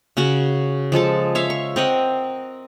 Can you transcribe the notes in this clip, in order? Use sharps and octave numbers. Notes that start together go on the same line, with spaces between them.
C#3 C#4 F#4 F#5
F3 G#3 A4 A5
C#5 E5 F5
C#6
C4 A#4 D#5 F#5